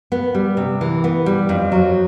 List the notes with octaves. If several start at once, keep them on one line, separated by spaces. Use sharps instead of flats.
B3
G3
C3
E3
B3
G3
F2
F#3